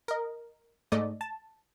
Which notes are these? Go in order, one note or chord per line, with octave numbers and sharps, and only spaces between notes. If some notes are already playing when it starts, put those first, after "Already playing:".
A#4 D#5
G#2 A3 D5 D#5
A5